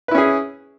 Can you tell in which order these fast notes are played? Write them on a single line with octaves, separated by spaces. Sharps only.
B4 E4 C#4 G#4